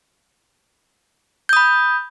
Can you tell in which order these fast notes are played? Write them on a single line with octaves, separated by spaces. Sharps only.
G6 D#6 B5